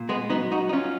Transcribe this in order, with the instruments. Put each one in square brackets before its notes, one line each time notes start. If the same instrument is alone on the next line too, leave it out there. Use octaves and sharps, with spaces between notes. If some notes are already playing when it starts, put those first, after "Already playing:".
Already playing: [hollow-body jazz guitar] A#2
G#3 B3
F#3 B3 D#4
D#4 F#4
D#4
F#3 C#4 F4